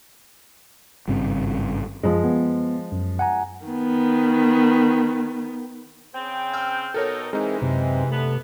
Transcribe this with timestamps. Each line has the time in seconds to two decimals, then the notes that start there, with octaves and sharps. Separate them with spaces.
1.08 G#1 G2 C#3 C4
2.03 F#2 F3 G#3
2.24 B3
2.92 F#2
3.19 F#5 G#5 A#5
3.66 D#3 B3
6.14 C#3 C4 G5
6.54 E6 F6 G6
6.94 B2 D#4 A4 A#4 C#5
7.33 E3 G#3 C4 D#4 G#4 A#4
7.62 F#2 C3 C4
8.11 D3 A3 B3